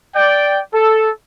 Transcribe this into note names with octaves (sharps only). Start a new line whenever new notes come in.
D5 G5
A4